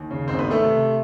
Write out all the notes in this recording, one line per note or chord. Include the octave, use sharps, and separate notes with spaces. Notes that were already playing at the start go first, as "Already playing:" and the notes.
Already playing: D#2
C#3
G#1 C4 C5
B3 B4
D#3
A3 A4
C3